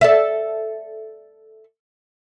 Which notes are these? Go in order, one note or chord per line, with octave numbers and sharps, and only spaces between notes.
A4 D5 E5